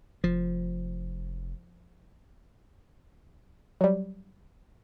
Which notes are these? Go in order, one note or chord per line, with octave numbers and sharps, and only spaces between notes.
F1 F3
F#3 G3